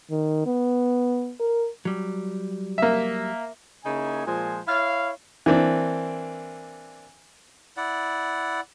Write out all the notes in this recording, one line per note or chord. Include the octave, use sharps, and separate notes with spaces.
D#3
B3
A#4
F#3 G3
A#3 E5
C#3 A#3 D#4 E4 G#5
A#2 F3 G#3 C5 G#5
E4 C#5 F5
E3 A#3 C4 D4
E4 D5 F#5